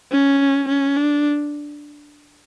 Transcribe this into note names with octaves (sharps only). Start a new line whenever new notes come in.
C#4
C#4
D4